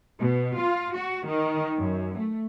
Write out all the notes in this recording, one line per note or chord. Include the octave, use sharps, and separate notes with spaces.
B2
F4
F#4
D#3
F#2
A3